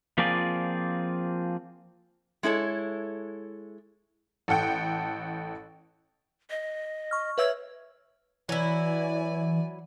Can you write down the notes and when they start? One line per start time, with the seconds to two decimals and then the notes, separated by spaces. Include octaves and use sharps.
0.18 F3 A#3 C4 F4 G#4 D5
2.43 G#3 E4 A4 C#5
4.48 A1 A4 F#5 G5
6.50 D#5
7.11 C#6 F6
7.38 B4 C#5 E5 E6
8.49 E3 F#3 E4 D5 G#5